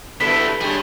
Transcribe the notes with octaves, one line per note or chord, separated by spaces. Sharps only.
G2 B2 D3 A3 B3 E4 A4 B6
G3 G#3 D4 G#4 C#5